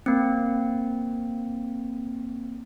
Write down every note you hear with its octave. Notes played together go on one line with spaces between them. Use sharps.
A#3 C4